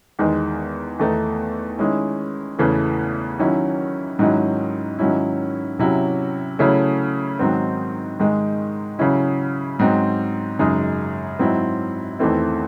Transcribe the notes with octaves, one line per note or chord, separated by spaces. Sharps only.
E2 D#3 G#3
E2 D#3 A3 D#4
D#3 G#3 C#4 E4
E2 C#3 E3 A3
D#3 F#3 C#4 E4
G#2 D#3 F#3 C#4 E4
G#2 D#3 F#3 C#4 E4
C3 F#3 C#4 E4
C#3 F#3 A3 C#4 E4
G#2 D#3 F#3 C4
G#2 D#3 G#3
C#3 F#3 C#4 E4
G#2 F#3 C4
F#2 C#3 G#3 D#4
G#2 F#3 C4 E4
E2 D#3 A3 C4 E4